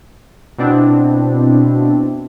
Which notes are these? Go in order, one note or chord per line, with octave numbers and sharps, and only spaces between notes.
B2 C4 D4 E4